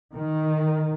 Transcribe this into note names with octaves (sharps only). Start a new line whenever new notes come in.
D#3